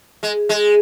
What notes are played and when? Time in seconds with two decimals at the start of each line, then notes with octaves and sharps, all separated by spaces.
0.23 G#3
0.49 G#3